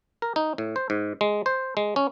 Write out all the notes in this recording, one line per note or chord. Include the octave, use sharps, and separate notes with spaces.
A#4
D#4
A2
C5
G#2
G#3
C5
G#3
C#4